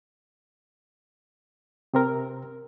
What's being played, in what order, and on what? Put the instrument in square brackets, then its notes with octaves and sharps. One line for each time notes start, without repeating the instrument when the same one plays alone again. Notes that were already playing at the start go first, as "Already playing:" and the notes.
[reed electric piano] C3 C4 A#4